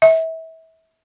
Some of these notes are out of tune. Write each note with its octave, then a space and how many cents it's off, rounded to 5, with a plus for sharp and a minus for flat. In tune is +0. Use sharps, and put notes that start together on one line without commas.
E5 -30